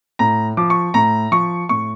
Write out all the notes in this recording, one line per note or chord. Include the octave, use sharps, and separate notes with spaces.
A2 A#5
F3 D6
C#6
A2 A#5
F3 C#6
A2 C#6